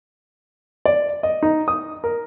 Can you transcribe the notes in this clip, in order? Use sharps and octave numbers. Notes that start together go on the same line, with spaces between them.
D5
D#5
D#4
D#6
A#4